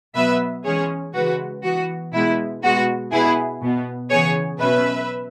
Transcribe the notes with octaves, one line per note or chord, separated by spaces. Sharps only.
B2 F#3 B3 B4 E5
E3 G#3 C#4 G#4 C#5
C#3 E3 G#3 F#4 B4
E3 B3 F#4
B2 G#3 B3 E4
B2 G#3 B3 F#4
B2 B3 E4 G#4
B2 B3
C#3 E3 B3 G#4 C#5
B2 F#3 C#4 B4 E5